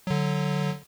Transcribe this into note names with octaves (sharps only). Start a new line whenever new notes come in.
D3 F#3